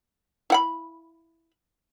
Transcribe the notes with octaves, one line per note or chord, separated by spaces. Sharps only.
E4 F#5 B5